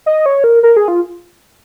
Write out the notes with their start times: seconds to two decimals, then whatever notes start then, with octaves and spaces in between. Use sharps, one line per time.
0.06 D#5
0.26 C#5
0.44 A#4
0.63 A#4
0.76 G#4
0.88 F4